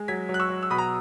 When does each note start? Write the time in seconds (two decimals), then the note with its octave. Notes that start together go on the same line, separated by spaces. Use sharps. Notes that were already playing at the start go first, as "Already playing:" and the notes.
Already playing: G#3
0.08 F#3 G#6 B6
0.29 F#3
0.34 F#6
0.40 C#6 E6
0.50 F#3
0.63 E6
0.70 B2 B5 D#6
0.78 A#5